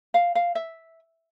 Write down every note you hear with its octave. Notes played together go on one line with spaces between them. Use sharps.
F5
F5
E5